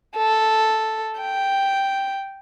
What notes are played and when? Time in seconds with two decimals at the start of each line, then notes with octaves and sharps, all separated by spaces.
0.16 A4
1.21 G5